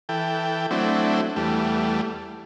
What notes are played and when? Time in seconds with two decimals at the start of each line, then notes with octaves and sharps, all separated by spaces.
0.09 E3 A4 G5
0.71 F#3 A3 C4 D4 E4
1.36 E2 G3 A3